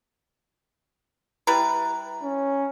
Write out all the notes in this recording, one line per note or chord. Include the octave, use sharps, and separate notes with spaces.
G3 E4 B4 A#5
C#4